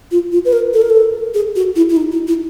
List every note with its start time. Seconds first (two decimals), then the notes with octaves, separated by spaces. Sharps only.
0.11 F4
0.32 F4
0.45 B4
0.53 A#4
0.74 A4
0.82 A#4
0.90 A4
1.34 G#4
1.56 F#4
1.76 E4
1.89 E4
1.97 D#4
2.12 E4
2.28 E4